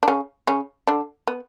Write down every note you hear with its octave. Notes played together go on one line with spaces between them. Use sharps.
D4
C#3 C#4
C#3 C#4
D3 D4
B3